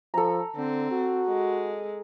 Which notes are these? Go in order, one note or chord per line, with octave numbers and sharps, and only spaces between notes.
F3 A4 A#5
D3 C4
F#4
G#3